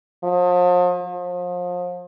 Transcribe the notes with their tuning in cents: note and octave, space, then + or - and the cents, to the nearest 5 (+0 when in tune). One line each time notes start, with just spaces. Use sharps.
F3 +40
F3 +35